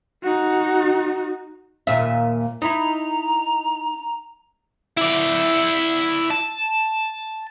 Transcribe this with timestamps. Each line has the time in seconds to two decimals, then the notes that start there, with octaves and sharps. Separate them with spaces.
0.23 D#4 F#4
1.87 D#2 A#2 E5
2.62 D#4 E4 A#5
4.97 E4 D5
6.31 A5